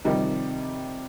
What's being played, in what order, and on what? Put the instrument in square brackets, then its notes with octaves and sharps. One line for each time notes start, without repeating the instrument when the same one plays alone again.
[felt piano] C3 D#3 F3 G3 D#4